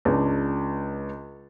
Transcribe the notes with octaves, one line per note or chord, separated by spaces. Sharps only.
C#2 D4